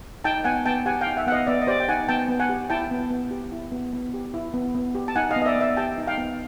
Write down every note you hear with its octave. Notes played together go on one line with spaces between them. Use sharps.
D#4 G5 A5
B3 F#5 G#5
B3 G5 A5
G4 F#5 G#5
F5 G5
D#4
E5 F#5
B3 F#5
D#5 F5
B3 D5 E5
D#5
G4 C5 D5
G5
D#4 F#5 G#5
B3 G5 A5
B3
F#5 G#5
G4
E4 G5 A5
B3
B3
G4
E4
B3
B3
G4
E4
B3
B3
G4
A5
D#4 F#5 G#5
D#5 F5
B3
D#5
D5 E5
B3
D5 E5
G4 G5 A5
D#4
F5 G5
B3